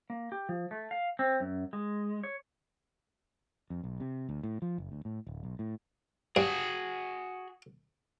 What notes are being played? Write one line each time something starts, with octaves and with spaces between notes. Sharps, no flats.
A#3
G4
F3
A3
F5
C4
F#2
G#3
C#5
F2
B1
C3
D2
A2
F3
F#1
D2
A2
D1
B1
A2
G2 F#4 G#4